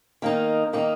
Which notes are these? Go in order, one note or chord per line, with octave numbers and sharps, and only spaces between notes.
D#3 A#3 D#4
D#3 A#3 D#4